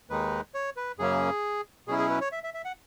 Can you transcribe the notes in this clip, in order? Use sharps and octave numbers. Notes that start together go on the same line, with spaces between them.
D#2 D#3 G#3 D#4 B4
C#5
B4
F#2 C#3 F#3 A#3 C#4 G#4
B2 F#3 C#4 E4 G#4
G#4
B4
C#5
E5
E5
E5
F#5